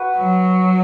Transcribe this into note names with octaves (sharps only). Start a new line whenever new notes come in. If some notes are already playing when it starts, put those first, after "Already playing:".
Already playing: F#4 B4
F#3